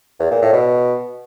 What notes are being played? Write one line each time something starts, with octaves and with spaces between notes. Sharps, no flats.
E2
A#2
A2
B2